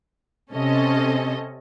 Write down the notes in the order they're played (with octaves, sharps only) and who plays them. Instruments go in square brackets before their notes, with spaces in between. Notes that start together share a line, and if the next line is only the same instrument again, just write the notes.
[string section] C3 C#4 A4 D#5